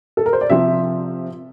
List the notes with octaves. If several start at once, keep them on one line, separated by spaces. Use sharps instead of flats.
A4
A#4
C5
D5
C3 F3 C4 E5